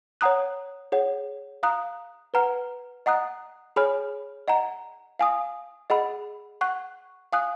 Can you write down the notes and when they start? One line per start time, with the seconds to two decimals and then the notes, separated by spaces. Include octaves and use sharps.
0.21 C#5 F#5 A#5 D#6 F#6
0.92 G#4 C#5 F#5
1.63 F5 A#5 D#6 F#6
2.34 B4 F#5 A#5 F6
3.06 D#5 F#5 A#5 D#6 F#6
3.76 G#4 C#5 G#5 B5 F6
4.48 D#5 F#5 A#5
5.19 F5 G#5 D#6
5.90 G#4 D#5 F#5 B5
6.61 F#5 C#6 F#6
7.33 F5 G#5 D#6 F#6